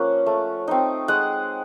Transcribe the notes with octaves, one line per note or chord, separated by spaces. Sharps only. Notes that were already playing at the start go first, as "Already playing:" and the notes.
Already playing: F3 A#3 C#4 F#5
A3
C4 D#4
G#3 F#5